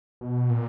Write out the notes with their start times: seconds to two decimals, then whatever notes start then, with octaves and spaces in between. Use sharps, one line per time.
0.21 B2
0.50 A#2